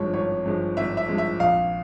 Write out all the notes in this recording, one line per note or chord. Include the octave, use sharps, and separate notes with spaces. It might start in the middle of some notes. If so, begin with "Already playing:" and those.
Already playing: G#1 G2 F3 G#3 C#5
G#1 C#5
G2 F3 G#3
G#1 E5
E5
G2 F3 G#3
E5
A#1 F5